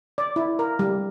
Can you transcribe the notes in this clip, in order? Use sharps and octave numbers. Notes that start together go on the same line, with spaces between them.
D5
E4
A#4
G3